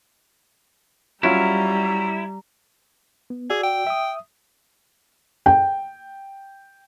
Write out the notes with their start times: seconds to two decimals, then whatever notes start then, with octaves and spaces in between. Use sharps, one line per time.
1.23 F#3 G3 C#4 E4 F4 A#5
3.30 B3
3.50 F#4 G#4 D5 E6
3.63 G5
3.87 E5 D#6
5.46 G5